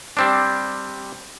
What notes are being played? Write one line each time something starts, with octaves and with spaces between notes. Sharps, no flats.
G3 C4 D4